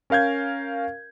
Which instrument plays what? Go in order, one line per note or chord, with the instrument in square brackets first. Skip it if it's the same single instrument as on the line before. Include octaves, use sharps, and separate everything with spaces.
[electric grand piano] C#4 A#4 F5 G6 G#6